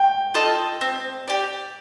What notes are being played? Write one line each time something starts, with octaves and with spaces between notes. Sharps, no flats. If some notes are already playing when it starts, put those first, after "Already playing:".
Already playing: G5
F4 A4 D#5
C4
G4 D5